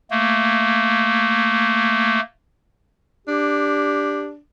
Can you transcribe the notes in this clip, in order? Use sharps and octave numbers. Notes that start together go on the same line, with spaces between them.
A3 A#3
D4 G4